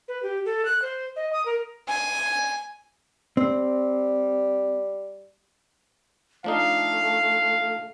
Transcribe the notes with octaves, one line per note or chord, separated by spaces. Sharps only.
B4
G4
A4
F#6
C5
D#5
D#6
A#4
G#5
G3 C4
F3 A3 D4 D#4 F5